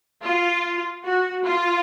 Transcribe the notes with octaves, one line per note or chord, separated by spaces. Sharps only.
F4
F#4
F4